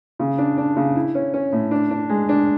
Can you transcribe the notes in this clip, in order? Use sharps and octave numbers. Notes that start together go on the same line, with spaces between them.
C#3
D4
D4
C#3
E4
C#4
C#4
A2
D4
D4
G#3
D4